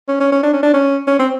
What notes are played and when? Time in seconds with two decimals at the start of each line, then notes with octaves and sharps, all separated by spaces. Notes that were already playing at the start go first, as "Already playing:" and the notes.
0.08 C#4
0.20 C#4
0.32 C#4
0.43 D4
0.53 C#4
0.63 D4
0.73 C#4
1.07 C#4
1.20 C4